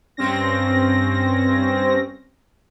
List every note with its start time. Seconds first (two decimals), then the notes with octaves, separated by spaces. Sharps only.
0.17 G2 C4 C#4 A#6